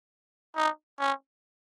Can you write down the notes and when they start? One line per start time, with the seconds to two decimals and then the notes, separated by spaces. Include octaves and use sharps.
0.56 D#4
0.99 C#4